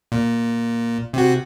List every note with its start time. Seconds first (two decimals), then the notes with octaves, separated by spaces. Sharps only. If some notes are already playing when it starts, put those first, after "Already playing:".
0.12 A#2
1.13 C3 F#4